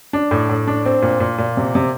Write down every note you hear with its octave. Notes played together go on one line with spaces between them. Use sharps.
D4
A2
A2
D4
C4
A#2
A#2
A#2
C3
C3